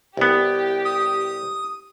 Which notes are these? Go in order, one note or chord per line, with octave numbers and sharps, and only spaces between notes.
C2 B3 G4
D#6